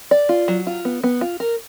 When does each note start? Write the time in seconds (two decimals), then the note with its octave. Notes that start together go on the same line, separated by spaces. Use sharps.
0.11 D5
0.29 F4
0.48 F#3
0.67 F4
0.85 B3
1.04 B3
1.21 F4
1.40 A#4